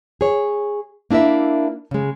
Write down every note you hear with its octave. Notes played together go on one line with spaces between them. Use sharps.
G#4 C#5
A#3 D4 E4 A#4 E5
C#3 G#3